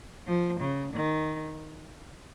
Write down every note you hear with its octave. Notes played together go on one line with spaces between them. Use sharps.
F3
C#3
D#3